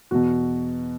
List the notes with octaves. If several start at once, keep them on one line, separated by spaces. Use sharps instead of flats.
E2 B2 F#4